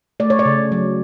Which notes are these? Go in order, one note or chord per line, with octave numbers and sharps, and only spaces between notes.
A3 D5
C#5
D5
C#3
F#3